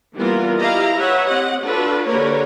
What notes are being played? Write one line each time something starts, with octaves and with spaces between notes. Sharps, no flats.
E3 G3 A#3 B3 F4 A#4
E4 G4 D#5 F5 A#5
B4 C#5 E5 F#5
C4 G4 D#5 F#5
D4 F4 F#4 A4 B4
D3 A#3 G4 A#4 B4 C#5